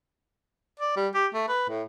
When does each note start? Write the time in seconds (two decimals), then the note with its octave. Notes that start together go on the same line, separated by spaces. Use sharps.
0.80 D5
0.96 G3
1.14 G4
1.34 A3
1.48 B4
1.69 A2